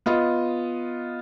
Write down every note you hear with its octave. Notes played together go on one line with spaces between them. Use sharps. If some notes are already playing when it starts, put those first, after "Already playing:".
B3 F4 D#5